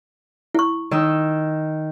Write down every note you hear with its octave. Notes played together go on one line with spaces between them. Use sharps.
E4 C#6
D#3 D#5 E6